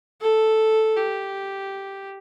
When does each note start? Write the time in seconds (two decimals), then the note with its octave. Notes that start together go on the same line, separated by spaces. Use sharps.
0.21 A4
0.97 G4